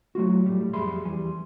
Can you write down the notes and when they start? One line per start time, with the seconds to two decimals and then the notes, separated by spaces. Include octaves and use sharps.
0.15 F#3 A3 F4 F#4
0.46 A2 G3
0.73 F2 G3 G#4 E5 B5 C6
1.05 E2 G3 G#5